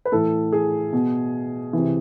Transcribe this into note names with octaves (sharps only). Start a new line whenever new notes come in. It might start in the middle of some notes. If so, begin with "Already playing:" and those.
B4
A2 E3 A4
G#4
B2
C3 E3